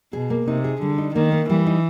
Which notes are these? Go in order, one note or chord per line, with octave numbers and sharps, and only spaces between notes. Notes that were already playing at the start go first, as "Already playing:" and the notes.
B2 G#4
A#3
C3 D#4
G#4
D3 G3
D#4
D#3 A#3
A#3
E3 G3
D#4